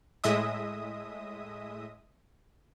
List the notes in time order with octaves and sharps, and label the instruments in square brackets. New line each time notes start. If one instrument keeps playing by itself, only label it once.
[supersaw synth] A2 G#3 D#5 E5 D#6